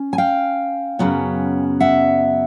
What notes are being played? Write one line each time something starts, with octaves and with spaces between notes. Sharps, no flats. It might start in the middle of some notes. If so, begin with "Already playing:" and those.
Already playing: C#4
G#5
F5 G5
F#2 C#3 F#3 B3
E5 F#5